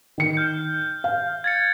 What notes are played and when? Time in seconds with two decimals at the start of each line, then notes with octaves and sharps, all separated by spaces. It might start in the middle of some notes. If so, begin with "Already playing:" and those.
0.18 D#3 C#7
0.37 F6 G6
1.04 F5
1.44 G#6 A6 C#7